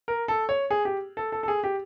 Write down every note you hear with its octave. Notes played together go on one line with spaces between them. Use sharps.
A#4
A4
C#5
G#4
G4
A4
A4
A4
G#4
G4